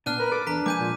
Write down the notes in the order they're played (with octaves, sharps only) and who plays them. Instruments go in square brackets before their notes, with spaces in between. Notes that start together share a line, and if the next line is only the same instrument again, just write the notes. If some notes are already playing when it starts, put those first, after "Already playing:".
[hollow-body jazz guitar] A#2 B3 [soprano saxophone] D4 [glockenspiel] F6 F#6 D#7
[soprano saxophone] A#4 [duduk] B4
[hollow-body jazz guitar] A4 [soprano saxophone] D6
[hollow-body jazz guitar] E2 [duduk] D4 [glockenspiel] A#5 B6
[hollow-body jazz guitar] F3 G#3 A#3 [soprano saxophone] G#5 [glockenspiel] D6 G6 D#7
[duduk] A#2